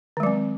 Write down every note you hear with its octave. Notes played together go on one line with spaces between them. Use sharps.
D#3 F#3 G#3 C4